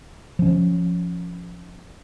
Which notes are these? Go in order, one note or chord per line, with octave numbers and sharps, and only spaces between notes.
F3 C#4